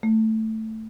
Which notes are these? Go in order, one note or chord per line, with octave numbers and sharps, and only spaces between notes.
A3